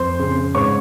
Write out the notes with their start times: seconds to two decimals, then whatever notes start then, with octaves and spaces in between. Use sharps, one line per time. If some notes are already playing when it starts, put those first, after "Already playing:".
Already playing: F2 C5 C6
0.20 C#3
0.54 G#2 C#5 C#6